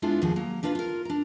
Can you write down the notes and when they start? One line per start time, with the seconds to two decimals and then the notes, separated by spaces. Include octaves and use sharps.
0.02 G#3 B3 D4 E4 F4
0.22 D#2 G#2 F3 G#4 F#5
0.36 F#3 A#3 A#5
0.63 A#3 D4 F4 B4
0.75 F4 A#4
1.05 D4 A#5